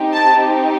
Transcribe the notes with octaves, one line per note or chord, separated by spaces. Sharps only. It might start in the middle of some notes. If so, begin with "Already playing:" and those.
Already playing: C4 D#4 G4
A5